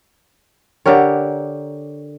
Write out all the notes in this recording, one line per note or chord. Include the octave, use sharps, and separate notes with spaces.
D3 G4 A#4 C#5